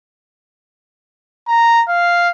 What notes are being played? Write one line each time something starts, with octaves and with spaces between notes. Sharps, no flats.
A#5
F5